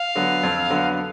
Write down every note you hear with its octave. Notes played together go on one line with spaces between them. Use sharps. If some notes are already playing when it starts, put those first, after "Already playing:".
Already playing: F5
D3 F#3 B3
F2
D3 F#3 B3